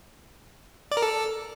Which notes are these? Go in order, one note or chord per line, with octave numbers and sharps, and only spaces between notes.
D5
A#4
A4